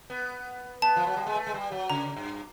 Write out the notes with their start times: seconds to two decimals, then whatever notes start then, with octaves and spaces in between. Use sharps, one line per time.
0.10 B3
0.82 B3 A5
0.96 F3
1.07 F#3
1.17 G3
1.26 G#3
1.36 A3
1.47 G#3
1.54 G3
1.71 F#3
1.90 C#3 A#5
2.16 G2